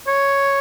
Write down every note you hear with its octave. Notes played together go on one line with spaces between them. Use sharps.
C#5